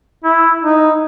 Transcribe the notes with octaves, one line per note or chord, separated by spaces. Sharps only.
E4
D#4